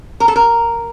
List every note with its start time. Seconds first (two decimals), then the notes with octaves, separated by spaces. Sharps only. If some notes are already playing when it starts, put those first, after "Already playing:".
0.20 A#4
0.28 A4
0.36 A#4